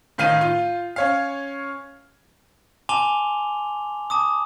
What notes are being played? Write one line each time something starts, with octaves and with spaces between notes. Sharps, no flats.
A2 D#3 F5 G6 D#7
F4
C#4 C#5 F5
G#5 A5 C6 D6 F7 G7
A5 D6 D#6